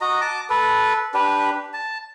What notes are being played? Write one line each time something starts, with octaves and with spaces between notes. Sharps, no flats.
F#4 D#5 A#5
A5 D6
A4 B4
D4 G4 B4
A5